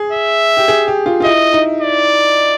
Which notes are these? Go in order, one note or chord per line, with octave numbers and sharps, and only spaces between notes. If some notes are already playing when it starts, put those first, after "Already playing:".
Already playing: G#4
E5
G4
G#4
G4
F4
F4
E4 D#5
D#4
D5